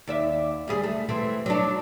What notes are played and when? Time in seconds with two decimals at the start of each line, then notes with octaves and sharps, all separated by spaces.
0.07 D#2 D5 E5
0.68 D2 G3 G#4
0.83 A3
1.09 E3 A3 C4
1.46 F#3 D4